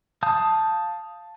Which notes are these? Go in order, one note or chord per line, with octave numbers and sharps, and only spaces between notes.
F5 A5 D#6 G6